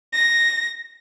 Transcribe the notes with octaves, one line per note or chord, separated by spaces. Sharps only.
A#6